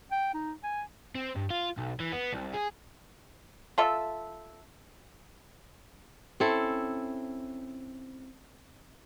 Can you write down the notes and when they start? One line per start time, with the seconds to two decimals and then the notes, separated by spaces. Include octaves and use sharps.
0.12 G5
0.34 D#4
0.64 G#5
1.15 C4
1.36 G2
1.50 F4
1.78 B1
2.00 E3
2.12 B3
2.33 C2
2.54 G#4
3.78 F4 A4 E5
6.40 C4 C#4 E4 A4